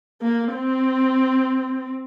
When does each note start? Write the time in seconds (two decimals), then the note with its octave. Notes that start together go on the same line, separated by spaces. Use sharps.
0.22 A#3
0.54 C4